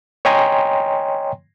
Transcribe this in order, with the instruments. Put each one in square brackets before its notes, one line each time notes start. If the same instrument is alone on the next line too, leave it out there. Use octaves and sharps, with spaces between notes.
[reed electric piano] C#5 D#5 G5 G#5 A#5 C6